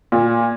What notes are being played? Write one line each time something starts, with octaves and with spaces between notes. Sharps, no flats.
A#2